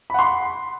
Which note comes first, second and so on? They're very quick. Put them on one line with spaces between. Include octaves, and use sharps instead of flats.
B5 F#5 C6